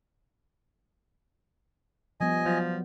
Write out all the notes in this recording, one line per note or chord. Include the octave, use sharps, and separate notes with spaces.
F3 G3 B3 D#5 G#5
F3 F#3